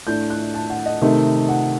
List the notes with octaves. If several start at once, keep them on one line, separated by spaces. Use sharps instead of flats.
A2 A3 D4 G6
F#6
A5
F#5
D#5
C3 D#3 A3 D#4
F#5